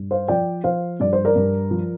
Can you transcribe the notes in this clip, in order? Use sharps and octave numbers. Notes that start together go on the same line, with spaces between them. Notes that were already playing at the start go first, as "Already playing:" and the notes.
Already playing: G2
C5 F5
F3 D5 G5
F3 C5 F5
G2 D5
C5
A#4 D5
G2
F3